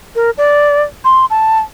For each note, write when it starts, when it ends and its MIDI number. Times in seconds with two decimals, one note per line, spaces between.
0.15 0.30 70
0.38 0.83 74
1.05 1.26 84
1.30 1.60 81